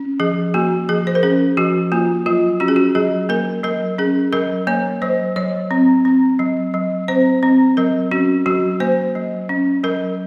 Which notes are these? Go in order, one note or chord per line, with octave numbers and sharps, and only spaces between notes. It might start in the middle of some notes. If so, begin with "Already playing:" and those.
Already playing: C#4
F3 G#4
A#3 F#4
F3 G#4
C5
A#4
C#4 G#4
F3 F#4
A#3 F4
F#3 F4
C#4 F#4
G#4
F#4
F#3 G#4
A#3 A#4
F#3 A#4
C#4 G#4
F#3 A#4
A#3 C#5
F#3 C5
F#3 C#5
C4
C4
F#3
F#3
C4 C5
C4
F#3 A#4
C#4 F#4
F#3 F#4
A#3 C5
F#3
C#4
F#3 A#4